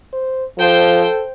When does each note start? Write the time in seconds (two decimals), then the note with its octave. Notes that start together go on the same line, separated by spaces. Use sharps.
0.13 C5
0.59 F3 A4 C5 G5